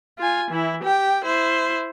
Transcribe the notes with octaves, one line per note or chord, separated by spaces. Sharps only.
F4 G#5
E3 E4
G4 G5
E4 C5